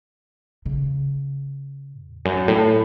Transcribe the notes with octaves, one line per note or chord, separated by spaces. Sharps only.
C#3
E2
F#2
A2